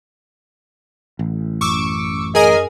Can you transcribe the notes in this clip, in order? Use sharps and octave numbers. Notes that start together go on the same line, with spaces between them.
A1
F#2 C#6 D6 E6
G#4 A#4 D#5 G#5